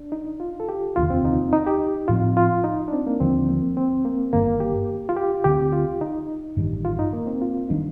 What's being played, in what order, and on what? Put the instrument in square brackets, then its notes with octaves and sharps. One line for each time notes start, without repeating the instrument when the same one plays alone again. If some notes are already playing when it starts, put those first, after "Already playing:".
Already playing: [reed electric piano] D4
D#4
F4
A4
G4
[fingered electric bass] F1 D#2 D3 [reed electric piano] F4
[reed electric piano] C4
D#4
D#4
G4
[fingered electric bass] A2 F3 C4 [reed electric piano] F4
[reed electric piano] F4
D#4
D4
C4
A#3
[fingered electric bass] D#2 D3 F3 [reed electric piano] C4
[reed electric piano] A#3
C4
A#3
[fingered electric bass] G1 G2 D#3 [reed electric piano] A#3
[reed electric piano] G4
F4
G4
[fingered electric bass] D2 D3 G3 C4 [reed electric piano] G4
[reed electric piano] F4
D#4
[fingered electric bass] A1 G2 D#3 G3
[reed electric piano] F4
D#4
A#3
C4
F4
[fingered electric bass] D#3 G3 D4 [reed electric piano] D#4